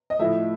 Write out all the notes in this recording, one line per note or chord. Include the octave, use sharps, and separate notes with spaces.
D#5
A2 F3 A3 E5